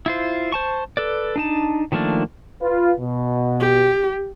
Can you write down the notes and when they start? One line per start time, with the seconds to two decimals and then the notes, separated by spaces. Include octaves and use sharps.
0.06 E4 F4 C5
0.52 C5 A5 C#6
0.97 A4 B4 D5
1.36 D4 D#4 A5
1.92 D#3 F3 A3 A#3 D4
2.62 F4 B4
3.00 B2
3.60 G4